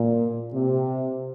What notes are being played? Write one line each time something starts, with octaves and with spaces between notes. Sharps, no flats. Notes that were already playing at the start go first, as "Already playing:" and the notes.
Already playing: A#2
C3